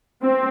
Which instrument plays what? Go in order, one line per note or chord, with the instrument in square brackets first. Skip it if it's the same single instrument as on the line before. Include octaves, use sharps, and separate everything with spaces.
[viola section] C4